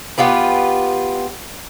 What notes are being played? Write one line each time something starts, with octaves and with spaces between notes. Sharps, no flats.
B3 F4 G4 B4